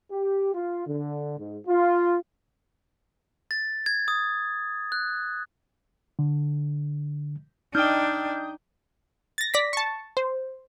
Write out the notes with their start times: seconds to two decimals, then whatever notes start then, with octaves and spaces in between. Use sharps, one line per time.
0.10 G4
0.54 F4
0.87 D3
1.38 G#2
1.67 F4
3.51 A6
3.86 G#6
4.08 D#6
4.92 F#6
6.19 D3
7.75 D4 D#4 G5 D#6 F6 G6
9.38 A6 A#6
9.54 D5 A#6 B6
9.73 A5 C#6
10.17 C5